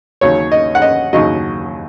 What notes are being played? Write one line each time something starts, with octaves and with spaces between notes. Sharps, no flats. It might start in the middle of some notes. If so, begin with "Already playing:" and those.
D#2 C#3 F#3 C#5
D#5
F#5
D#5
D#2 C#3 F#3 D#5